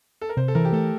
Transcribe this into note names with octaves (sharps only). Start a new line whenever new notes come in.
A4
A#4
C3 C5
A4
E3 A#4
G4
A3 A4